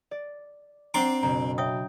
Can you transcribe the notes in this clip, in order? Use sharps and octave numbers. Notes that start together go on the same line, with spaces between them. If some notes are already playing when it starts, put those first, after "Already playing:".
D5
C4 D4 F#5 A#5 C6 D6
F#1 B2 A#5
C#5 E5 G5 D#6